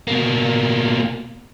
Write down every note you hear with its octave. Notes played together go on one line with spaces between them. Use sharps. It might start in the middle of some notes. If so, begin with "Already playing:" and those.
B2 A#3